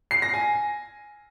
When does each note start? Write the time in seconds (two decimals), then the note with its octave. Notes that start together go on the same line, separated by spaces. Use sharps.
0.11 C7
0.22 A#6
0.34 G#5